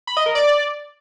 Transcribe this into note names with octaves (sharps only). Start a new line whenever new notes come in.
B5
D#5
A#4
D5